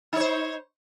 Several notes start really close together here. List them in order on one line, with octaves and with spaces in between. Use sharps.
D#4 C#5 C5